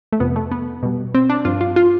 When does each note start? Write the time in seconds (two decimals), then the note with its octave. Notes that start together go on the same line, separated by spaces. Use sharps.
0.12 A3
0.20 F2 C3 F3 B3
0.36 A3
0.51 B3
0.83 B2 G3
1.15 C4
1.30 D4
1.45 G2 F3 F4
1.61 F4
1.76 F4